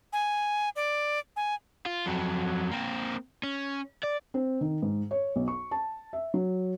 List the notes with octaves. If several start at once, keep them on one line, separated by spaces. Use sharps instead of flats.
G#5
D5
G#5
F4
F2 F#3
A#3 C4
C#4
D5
C4
D#3
G#2
C#5
B1
C#6
A5
E5
F#3